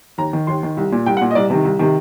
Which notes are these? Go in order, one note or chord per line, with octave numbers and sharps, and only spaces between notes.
D#2 A#5
D#3
D#2 C6
D#3
C2
A#2
C2 G5
F#5
A#2
D#5
C2 D5
C3 D#3
C2
C3 D#3